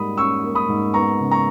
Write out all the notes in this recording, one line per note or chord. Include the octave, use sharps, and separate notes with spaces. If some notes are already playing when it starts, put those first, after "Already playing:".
Already playing: G#2 G3 A#3 B5 D#6
C#4 C#6 E6
A#3
B5 D#6
G#2
B3 A#5 C#6
C#3
A#5 C#6